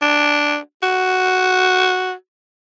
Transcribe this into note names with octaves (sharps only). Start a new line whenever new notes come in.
D4
F#4